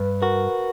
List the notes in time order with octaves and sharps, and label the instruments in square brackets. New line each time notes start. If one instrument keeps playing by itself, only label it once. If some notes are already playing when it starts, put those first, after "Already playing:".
Already playing: [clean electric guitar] G2 [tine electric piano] B4
[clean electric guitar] F#4 [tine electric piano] A#4